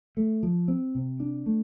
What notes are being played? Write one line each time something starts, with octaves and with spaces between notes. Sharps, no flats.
A3
F3
C4
C3
D4
A3